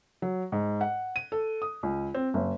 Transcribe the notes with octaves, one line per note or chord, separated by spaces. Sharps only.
F#3
G#2
F#5
D#7
A4
D#6
C#2
C4
F#1